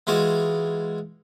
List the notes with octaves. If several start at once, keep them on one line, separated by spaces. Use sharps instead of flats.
E3 G#3 F4 F#4